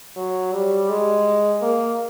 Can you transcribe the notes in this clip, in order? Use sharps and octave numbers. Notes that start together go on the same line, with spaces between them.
F#3
G3
G#3
A#3